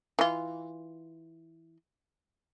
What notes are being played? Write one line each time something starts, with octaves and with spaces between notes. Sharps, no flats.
E3 F4